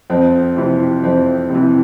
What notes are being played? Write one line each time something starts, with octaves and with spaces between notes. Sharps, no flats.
F2 C4
C3 E3
F2 C4
C3 E3